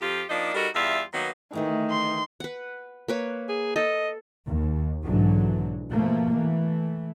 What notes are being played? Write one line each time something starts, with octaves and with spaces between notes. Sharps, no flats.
F2 F3 F4 G4
F3 A#3 D4 D#4
G3 D#4 F#4 A4 A#4
E2 G3 F4 E5
D#3 F#3 A#3 B3
D2 D#3 E3 A3
C6
B4 F#5
A#3 B4 C#5
G#4
A4 D#5
D#2
B1 G#2 D3 E3 F#3
B2 F3 A3 A#3
E3 A3